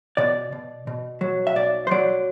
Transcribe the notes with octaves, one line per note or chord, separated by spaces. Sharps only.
B2 D5
B2
B2
F#3
E5
B1 D5
C5
F#3 D5